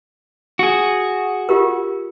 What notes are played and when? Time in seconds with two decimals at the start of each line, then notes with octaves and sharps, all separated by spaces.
0.59 F#4 G#4
1.49 F4 G4 A#4